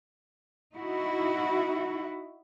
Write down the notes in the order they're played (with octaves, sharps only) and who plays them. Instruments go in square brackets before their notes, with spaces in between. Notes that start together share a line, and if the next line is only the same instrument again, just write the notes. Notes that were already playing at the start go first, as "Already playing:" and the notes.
[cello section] D#4 E4 F#4